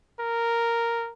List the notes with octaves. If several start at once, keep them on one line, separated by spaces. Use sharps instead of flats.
A#4